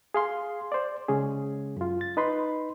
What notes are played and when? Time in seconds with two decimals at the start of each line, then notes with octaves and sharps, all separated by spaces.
0.14 G#4 F5 C6
0.72 C5 D5
1.09 C#3 G#3 C#4 G#4
1.76 F#2 F4
2.01 A6
2.17 D#4 B4 B5 C6